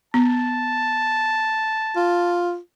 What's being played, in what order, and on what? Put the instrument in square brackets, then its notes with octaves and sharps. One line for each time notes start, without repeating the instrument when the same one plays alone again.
[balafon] B3 [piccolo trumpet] A5
[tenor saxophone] F4